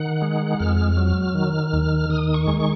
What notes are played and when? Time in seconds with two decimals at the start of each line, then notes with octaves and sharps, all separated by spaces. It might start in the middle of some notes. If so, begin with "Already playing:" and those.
Already playing: D#3 F#5
0.22 G#3
0.59 F2 F6
0.97 F#3
1.34 D#3
1.73 D#2
2.09 D#3 D#6
2.34 C#6
2.47 G#3
2.60 C#6